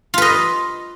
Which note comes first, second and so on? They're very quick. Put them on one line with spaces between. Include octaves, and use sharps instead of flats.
F4 B4 D#5